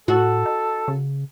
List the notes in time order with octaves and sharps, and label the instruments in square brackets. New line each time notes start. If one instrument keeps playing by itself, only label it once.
[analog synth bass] A2 [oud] F#4 [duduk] A4
[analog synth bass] D#4
C#3